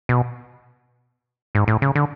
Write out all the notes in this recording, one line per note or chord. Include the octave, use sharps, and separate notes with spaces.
B2
G#2
A2
C#3
D3